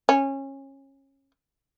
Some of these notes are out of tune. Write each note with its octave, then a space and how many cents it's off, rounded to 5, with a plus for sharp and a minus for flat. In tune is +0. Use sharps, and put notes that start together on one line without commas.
C#4 -25